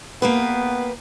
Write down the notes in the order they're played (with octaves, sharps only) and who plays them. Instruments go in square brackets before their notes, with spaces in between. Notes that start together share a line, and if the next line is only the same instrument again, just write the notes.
[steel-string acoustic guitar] A#3 G4 B4 [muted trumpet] B3